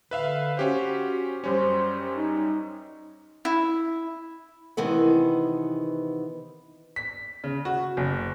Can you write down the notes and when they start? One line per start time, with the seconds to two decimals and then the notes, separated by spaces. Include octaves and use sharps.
0.11 D3 B4 E5 F5
0.57 C#4 F#4 G4 C5
1.44 F#2 G3 C#4 C5
2.15 D#4
3.45 E4
4.77 C3 D#3 E3 B3
6.96 B6
7.44 C#3
7.65 F#4
7.97 F#1